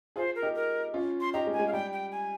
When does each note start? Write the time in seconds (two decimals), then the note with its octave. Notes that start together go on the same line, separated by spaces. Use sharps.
0.16 F4 G#4 C5
0.35 A#4
0.42 D#4 G4
0.55 A#4
0.94 C#4 F4
1.21 C6
1.34 D#4 G4 A#5
1.47 G#3
1.53 G#5
1.59 G#3
1.68 F5
1.73 G3 G5
1.93 G5
2.12 G#5